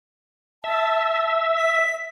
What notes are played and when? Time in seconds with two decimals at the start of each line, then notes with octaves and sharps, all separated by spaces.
0.64 E5 A5
1.55 B6